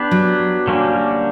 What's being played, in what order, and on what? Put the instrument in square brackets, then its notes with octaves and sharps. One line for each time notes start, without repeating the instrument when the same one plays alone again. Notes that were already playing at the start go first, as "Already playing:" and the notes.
Already playing: [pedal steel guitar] B3 D4 G4 B4
[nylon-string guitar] F#3
[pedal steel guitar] D3 G3 A#3 C#4